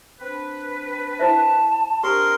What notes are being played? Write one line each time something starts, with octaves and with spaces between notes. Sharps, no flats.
C4 D4 B4
E4 C5 E5 A5
C4 D4 G4 A#4 D#5 C6